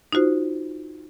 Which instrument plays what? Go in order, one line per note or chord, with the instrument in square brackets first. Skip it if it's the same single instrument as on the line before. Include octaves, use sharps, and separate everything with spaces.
[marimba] D#4 F4 F#4 C5